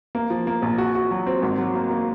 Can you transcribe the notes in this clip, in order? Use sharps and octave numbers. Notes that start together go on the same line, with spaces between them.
A#3
F3
A#3
A#1
F#4
F#4
F#3
C4
G#1
F#3
A#3
A#3